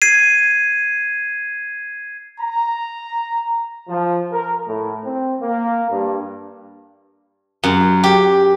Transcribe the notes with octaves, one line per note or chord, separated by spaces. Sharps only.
G#6 C7 D#7
A#5
F3
A#4
A2
C4
A#3
G2
F#2
G4